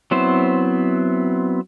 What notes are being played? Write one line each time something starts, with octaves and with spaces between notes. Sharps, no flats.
F#3 B3 C4 E4 C5